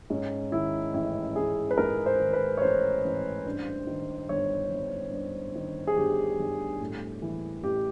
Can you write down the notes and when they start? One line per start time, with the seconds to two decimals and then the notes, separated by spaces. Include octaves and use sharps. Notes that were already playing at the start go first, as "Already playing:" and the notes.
0.10 G#2 C#4
0.52 D#3 E4
0.94 A1 E4
1.36 A1 G#4
1.71 B4
1.78 G#2 A#4
2.06 C5
2.19 D#3
2.33 B4
2.57 C#5
2.62 A1 C5
3.04 A1
3.45 G2
3.87 D#3
4.29 G1 C#5
4.71 G1
5.13 G2
5.55 D#3
5.87 G#4
5.96 G1 G4
6.39 G1
6.81 A2
7.22 E3
7.64 A1 G4